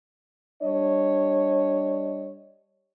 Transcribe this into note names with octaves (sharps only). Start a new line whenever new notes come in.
G3 D4 C#5 D#5